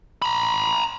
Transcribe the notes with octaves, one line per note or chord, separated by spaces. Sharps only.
A#5 B5